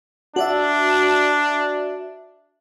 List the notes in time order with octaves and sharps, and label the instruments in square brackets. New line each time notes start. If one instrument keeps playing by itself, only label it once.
[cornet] D4 [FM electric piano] F#4 D5 E5